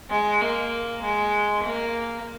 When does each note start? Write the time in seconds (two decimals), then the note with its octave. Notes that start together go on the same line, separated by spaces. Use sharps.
0.10 G#3
0.41 A#3
1.02 G#3
1.64 A#3